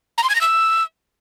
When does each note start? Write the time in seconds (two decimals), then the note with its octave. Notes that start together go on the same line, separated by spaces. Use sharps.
0.18 A#5
0.24 C6
0.29 G#6
0.35 A#6
0.41 E6